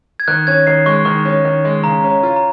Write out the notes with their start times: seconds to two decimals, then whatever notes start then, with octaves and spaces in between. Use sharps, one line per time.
0.20 G#6
0.28 D#3 F#6
0.47 C#4 G#6
0.67 D#3 C7
0.86 G#3 C#6
1.05 D#3 C#6
1.25 C#4
1.45 D#3
1.65 G#3
1.83 C#3 A#5
2.04 C#4
2.10 A#5
2.23 F4
2.36 A#5